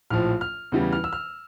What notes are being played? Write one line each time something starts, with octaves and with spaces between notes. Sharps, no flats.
A#1 A2 F3 F6
F6
E2 C#3 E3 G3
F6
E6
F6